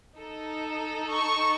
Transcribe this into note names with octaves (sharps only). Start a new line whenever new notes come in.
D#4 A4
C#6